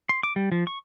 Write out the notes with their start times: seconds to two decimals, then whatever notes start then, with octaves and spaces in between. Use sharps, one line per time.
0.09 C6
0.23 D6
0.36 G3
0.52 F3
0.67 C#6